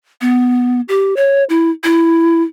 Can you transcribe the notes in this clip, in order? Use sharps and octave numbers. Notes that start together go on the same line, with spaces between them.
B3
G4
C#5
E4
E4